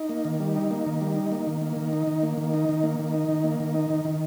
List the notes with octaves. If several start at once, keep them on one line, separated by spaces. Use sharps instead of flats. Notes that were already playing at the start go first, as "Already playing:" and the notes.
Already playing: D#4
A#3
D#3
G3
D#4
A#3
D#3
G3
D#4
A#3
D#3
A#3
D#3
D#4
D#3
A#3
D#3
D#4
D#3
A#3
D#3
D#4
D#3
A#3
D#3
D#4
D#3
D#3